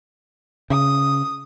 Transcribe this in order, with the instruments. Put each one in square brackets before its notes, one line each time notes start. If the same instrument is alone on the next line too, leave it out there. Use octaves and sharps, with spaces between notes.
[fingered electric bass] C#3 [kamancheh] D#6